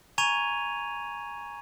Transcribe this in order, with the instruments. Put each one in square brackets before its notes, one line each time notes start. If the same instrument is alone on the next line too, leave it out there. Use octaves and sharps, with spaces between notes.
[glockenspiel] G#5 A#5 C#6 G#6 D#7 F7